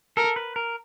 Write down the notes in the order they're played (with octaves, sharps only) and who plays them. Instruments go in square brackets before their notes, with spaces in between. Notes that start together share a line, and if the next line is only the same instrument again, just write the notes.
[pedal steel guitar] A4 [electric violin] A#4
[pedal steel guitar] B4
A#4